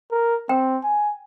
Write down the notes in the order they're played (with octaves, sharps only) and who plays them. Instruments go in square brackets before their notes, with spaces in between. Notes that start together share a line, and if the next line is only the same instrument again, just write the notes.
[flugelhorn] A#4
[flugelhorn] C4 [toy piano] G5
[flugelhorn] G#5